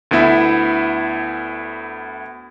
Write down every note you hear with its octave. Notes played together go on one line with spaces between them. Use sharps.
D2 B3 E4 E5